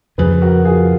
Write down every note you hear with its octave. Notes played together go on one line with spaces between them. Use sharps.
F2 C#3 F3 G#4 B4
F#4 A#4
F4 G#4